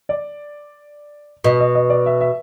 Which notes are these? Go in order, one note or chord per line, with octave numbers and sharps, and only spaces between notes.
D5
B2 D#5
D#5
D#5
D5
E5
E5